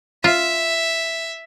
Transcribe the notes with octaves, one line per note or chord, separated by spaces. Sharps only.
F4 E5